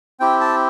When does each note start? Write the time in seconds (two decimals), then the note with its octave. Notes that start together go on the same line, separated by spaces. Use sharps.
0.20 C4 E4 G4 G5
0.41 A5